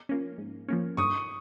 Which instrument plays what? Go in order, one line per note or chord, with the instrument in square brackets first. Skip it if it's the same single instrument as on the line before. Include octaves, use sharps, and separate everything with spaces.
[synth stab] F3 A#3 C#4
G#2
F3 A#3 C#4
[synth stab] G2 [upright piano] C#6 D#6